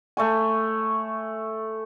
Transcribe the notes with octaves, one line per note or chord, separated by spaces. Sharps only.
A3 C#5 G#5